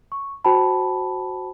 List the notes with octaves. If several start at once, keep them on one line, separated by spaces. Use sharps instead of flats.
C#6
F#4 C5 G5 A5 B5